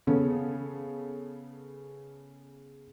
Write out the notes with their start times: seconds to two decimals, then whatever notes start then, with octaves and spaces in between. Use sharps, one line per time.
0.07 C#3 B3 C#4 A4